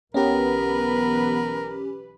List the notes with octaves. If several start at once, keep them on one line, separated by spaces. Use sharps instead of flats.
B1 E3 B3 C#4 G4 A#4 B4